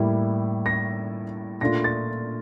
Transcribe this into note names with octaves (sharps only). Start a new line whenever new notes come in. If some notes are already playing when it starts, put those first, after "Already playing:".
Already playing: A2 G3 A#3 E4
A#6
A#2 A3 D4 F4 A#6
A6